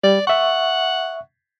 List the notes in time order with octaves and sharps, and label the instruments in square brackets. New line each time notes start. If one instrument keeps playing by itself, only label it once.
[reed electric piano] G3 [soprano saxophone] D5
[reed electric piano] E5 C#6 [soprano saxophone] F#5